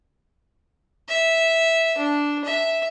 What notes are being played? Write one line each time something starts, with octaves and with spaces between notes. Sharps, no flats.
E5
D4
E5